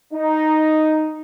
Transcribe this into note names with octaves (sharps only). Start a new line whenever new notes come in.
D#4